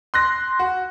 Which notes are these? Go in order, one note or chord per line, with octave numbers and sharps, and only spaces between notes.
C6 F#6 A#6
F#4